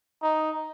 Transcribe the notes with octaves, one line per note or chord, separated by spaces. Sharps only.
D#4